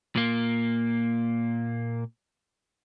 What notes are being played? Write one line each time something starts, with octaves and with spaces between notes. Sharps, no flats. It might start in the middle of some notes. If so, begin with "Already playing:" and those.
A#2 A#3